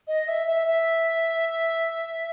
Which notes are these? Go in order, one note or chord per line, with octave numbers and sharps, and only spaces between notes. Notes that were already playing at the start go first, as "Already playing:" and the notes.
D#5
E5
E5
E5